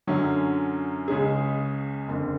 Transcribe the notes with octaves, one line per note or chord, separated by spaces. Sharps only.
F#2 D3 F#3 C#4
C#2 C#3 G#3 C#4 G#4
F#1 F2 D3